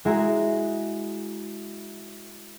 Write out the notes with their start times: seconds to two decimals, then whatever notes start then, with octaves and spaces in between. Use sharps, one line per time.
0.05 G#3 E4 F#4 A#5